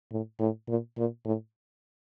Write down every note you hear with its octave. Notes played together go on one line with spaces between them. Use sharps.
A2
A2
A#2
A#2
A2